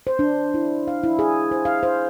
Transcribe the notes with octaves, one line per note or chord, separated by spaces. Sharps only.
C5
D4
E4
F5
E4
G#4
C5
F5
C5